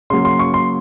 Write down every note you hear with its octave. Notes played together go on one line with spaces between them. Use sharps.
C#3 F#3 A#3 C6
C6
C#6
C6